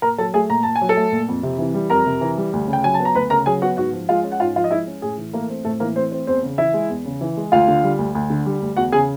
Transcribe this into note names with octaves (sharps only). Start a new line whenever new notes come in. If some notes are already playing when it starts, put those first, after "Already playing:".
A#2 A#4 A#5
F#3 A4 A5
A3 G#4 G#5
A#2 A#5
A#2 A5
G#5
F#3
A4 A5
A3
A#2
F2
C3
E3
G3
F2 A#4 A#5
C3
E3
G3
D2
C#3
G5
F#3 G#5
A5
B3
A#5
D2 B4 B5
C#3 A#4 A#5
F#3 G#4 G#5
B3 F#4 F#5
G#2 F#4 F#5
F3
G#3 F4 F5
C#4
F#5
G#2 F4 F5
F3 F4 F5
D#5
G#3 E4 E5
C#4
A2 G#4
E3
A3 A#3 A#4
C4
A2 A3 A4
E3 A#3 A#4
A3 C4 C5
C4 C5
E2 C4 C5
C#3
E3 E4 E5
G#3
E2
C#3
E3
G#3
D2 F4 F5
D3
G3
D2
D2
D3
G3
D2
E2 F#4 F#5
C#3 G#4 G#5